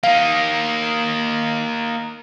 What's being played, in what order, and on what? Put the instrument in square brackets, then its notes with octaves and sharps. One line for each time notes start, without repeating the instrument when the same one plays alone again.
[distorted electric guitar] A#3 D#4 [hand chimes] F5